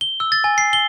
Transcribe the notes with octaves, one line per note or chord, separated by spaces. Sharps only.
G7
E6
A6
G#5
C7
G7